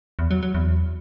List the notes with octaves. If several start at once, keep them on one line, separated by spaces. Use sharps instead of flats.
E2
F#3
F#3
E2